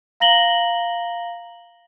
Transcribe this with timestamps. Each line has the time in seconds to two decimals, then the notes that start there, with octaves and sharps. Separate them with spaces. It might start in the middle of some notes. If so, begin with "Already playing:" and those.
0.20 F5 A#5 A#6 F#7 G7